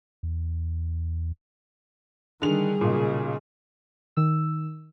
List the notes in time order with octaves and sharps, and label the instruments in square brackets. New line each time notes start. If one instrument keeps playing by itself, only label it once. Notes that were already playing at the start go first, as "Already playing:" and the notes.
[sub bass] E2
[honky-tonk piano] D3 F7 [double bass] D#3 G3 [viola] G#4
[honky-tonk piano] B1 A#2 [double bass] C#3
[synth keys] D#3 E6